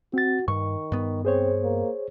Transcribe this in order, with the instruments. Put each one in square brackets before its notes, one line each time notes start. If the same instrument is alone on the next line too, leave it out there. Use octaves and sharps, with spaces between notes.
[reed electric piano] C4 A6 [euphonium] F#4
[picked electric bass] G2 [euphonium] D#3 [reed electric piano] C#6
[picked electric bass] G2 B3
[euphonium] C4 [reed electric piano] G#4 C5 C#5
[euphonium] A#3